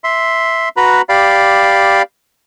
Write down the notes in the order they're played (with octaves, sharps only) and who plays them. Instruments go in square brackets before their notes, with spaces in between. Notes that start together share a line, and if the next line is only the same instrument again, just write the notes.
[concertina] E5 C6
F#4 B4 A#5 B5
G4 D5 F5 B5